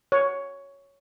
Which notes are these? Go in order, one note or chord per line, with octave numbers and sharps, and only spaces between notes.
C#5